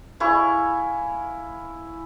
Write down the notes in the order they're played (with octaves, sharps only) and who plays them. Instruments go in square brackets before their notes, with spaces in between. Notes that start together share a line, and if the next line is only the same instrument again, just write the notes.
[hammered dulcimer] E4 F5 G#5 C#6